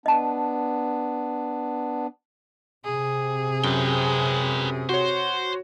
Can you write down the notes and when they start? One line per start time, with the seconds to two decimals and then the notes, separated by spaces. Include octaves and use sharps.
0.06 B3 D4 D#5 A5
2.85 C3 G#4
3.64 F#2 B4 G5
4.89 F#4 C5 C#5